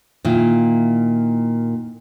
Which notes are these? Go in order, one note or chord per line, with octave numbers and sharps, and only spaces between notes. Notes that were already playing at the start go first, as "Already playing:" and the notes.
A#2 D#3 E4 F5